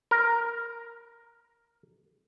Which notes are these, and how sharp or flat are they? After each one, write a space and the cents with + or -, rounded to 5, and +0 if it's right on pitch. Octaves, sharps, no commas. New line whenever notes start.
A#4 +0